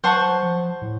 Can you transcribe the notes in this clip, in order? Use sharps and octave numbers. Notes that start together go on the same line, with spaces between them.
F#3 C5 F#5 A5 C#6
F3
A2